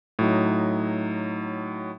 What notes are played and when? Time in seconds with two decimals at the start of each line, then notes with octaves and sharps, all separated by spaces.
0.19 A2 F#3 D#4